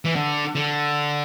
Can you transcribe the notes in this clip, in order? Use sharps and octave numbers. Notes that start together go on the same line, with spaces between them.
E3
D3
D3